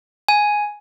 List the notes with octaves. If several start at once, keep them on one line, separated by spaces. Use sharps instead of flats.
G#5